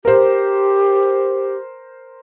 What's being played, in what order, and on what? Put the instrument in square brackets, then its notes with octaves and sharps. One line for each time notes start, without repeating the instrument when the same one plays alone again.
[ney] G4 [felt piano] A#4 C5